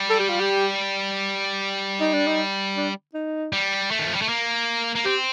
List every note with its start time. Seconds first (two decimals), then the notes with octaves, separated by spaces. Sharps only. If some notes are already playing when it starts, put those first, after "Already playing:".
Already playing: G3
0.10 A4
0.20 G4
0.29 F4
0.40 G4
2.00 D#4
2.13 D4
2.26 D#4
2.77 D4
3.14 D#4
3.53 G3
3.91 A3
3.99 D#3
4.07 F3
4.14 G3
4.22 A3
4.29 A#3
4.95 A#3
5.05 C4 G4